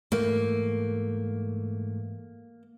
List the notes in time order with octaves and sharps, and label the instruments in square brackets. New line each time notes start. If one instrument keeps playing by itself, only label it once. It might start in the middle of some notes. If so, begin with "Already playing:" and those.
[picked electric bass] G#2 E3 A3 [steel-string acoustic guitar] A#3